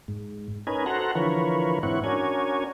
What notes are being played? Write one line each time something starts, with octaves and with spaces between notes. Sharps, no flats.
G#2
C#4 D#4 A#4 B4 G#5
F#4 A4 C5 F#5 A#5
D3 E3 F3 A#4 B4 C#5
G#2 E3 C4 E4 C#5 F#5
C#4 D4 F#4 A#4 C#5 G#5